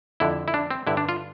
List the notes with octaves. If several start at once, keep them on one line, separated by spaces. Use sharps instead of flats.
F2 D3 E4
E4
D4
C4
G2 D3 E4
D4
F4